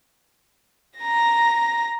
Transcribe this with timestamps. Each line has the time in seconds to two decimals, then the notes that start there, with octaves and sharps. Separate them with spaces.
0.99 A#5 A#6